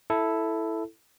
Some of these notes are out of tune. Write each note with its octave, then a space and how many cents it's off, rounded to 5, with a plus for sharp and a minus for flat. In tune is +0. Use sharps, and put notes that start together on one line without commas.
E4 +0 A4 +0